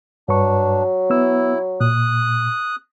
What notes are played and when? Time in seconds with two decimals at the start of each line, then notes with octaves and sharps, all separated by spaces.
0.29 G2 F#3 D4 B4 C#6
1.10 B3 E4 E6
1.81 A#2 D#6 F#6